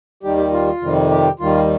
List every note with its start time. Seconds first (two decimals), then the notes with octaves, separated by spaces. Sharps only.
0.23 D#2 D#3 G3 G4
0.37 G4
0.52 F4
0.81 F2 C3 D#3 G3
1.11 G4
1.40 D#2 D#3 G3 F4